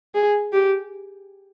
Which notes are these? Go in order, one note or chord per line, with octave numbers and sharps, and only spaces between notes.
G#4
G4